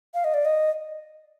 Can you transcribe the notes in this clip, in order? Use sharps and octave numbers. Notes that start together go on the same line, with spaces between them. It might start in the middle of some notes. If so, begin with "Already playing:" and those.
F5
D#5
D5
D#5